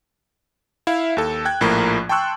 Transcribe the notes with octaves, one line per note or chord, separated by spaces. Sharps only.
E4 E5 F5
D#2 A4
G5 F#6 G#6
A#1 A2 F3 A#3 A#5 B5
G5 A5 C6 C#6 E6 F#6